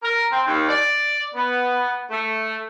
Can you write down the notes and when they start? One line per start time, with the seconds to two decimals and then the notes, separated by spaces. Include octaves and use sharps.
0.03 A#4
0.32 C4
0.47 D#2
0.68 D5
1.35 B3
2.11 A3